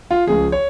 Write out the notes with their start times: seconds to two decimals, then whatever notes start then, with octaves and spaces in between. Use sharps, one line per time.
0.11 F4
0.27 C#2 C#3 F3 G#4
0.52 C#5